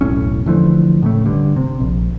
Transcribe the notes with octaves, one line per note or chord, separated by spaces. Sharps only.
E1 B1 A2 C#4
D3 E3 F3 A3
A2 C#3 A3
G2 D3
C3
A#1